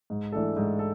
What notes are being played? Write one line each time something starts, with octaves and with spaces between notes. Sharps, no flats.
G#2
E3 A3 D4 A4
G#2
A4